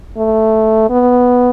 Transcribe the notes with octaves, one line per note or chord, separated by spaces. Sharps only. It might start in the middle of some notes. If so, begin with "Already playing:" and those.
A3
B3